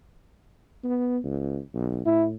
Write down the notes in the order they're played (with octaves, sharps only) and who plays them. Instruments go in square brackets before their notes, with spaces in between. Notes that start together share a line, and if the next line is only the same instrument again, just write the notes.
[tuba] B3
C#2
B1
[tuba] A2 [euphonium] E4